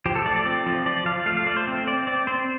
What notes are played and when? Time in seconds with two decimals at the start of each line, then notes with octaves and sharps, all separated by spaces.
0.06 F3 G4
0.15 A4
0.26 A3 D5
0.36 D5
0.46 C4
0.66 F3
0.86 F3 D5
1.06 F3 F5
1.26 A3 F5
1.37 F5
1.46 A3 D5
1.56 C5
1.67 C4
1.87 C4 D5
2.07 C4 D5
2.27 C4 C5